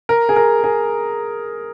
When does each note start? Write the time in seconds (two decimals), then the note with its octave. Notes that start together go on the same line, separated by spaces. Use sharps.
0.09 A#4
0.29 G#4
0.36 A#4
0.64 G#4